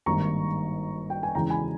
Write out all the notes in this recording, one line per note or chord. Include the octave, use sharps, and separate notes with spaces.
G#1 G2 D#3 A#3 A#5 C#6
G5
G#5
E2 C#3 E3 G#3 G5 A#5
G#5 B5